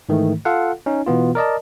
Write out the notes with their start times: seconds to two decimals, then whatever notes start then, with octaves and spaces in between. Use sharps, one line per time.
0.09 G#2 D#3 E3 A3
0.45 F4 A4 F5 F#5
0.86 C#4 D#4
1.06 B2 E3 B3 F4
1.35 A#4 D5 D#5 A5